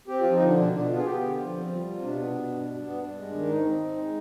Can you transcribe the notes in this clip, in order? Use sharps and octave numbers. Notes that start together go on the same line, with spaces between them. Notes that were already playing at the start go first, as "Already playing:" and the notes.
C4 G4
F3 F4
D#4
D3 D4
B2 D4
B2 D4
B3 F4
G#4
B3 G4
D3
F4
F3
C4
G3
C3
B2 D4
B3
B2
G2
G2
B3
G2 D4
G#3
D#3
G#2 D#4
C4
C4
G#3